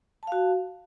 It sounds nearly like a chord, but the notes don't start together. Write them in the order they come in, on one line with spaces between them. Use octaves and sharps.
A5 F5 F#4